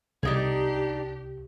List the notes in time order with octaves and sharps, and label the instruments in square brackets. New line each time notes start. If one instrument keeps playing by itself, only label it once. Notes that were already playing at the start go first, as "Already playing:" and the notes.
[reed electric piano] C2 [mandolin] D4 D#4 G#4 [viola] G4